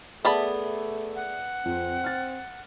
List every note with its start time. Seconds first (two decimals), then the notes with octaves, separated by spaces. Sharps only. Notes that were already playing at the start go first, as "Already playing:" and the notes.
0.25 A3 B3 G#4 D5 E5 A5 B5
1.16 F#5
1.65 F2 C4
2.04 F6 A6